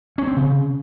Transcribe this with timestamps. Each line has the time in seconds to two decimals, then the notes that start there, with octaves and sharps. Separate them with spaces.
0.18 C#4
0.27 C4
0.37 C#3